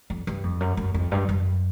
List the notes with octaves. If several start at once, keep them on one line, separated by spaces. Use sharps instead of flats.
F2
G2
F2
F#2
F#2
F2
G2
F#2